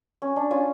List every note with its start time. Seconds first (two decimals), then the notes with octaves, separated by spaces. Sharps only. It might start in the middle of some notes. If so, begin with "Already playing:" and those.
0.22 C#4
0.36 D4
0.51 C#4 F4